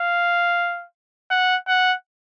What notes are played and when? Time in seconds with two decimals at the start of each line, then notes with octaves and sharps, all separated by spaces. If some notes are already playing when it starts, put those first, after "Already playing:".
Already playing: F5
1.30 F#5
1.68 F#5